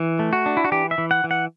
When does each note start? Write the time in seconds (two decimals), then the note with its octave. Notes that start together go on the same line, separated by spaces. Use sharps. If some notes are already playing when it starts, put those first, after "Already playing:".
Already playing: E3
0.19 A3
0.33 F#4
0.46 D4
0.57 E4
0.64 F#4
0.72 E3 G4
0.91 E5
0.98 E3
1.11 F#5
1.24 E3
1.31 F#5